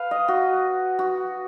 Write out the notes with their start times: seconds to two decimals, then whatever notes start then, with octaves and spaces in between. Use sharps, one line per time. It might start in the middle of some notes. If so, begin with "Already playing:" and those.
Already playing: B4 F5
0.11 D#5
0.28 F#4
0.99 F#4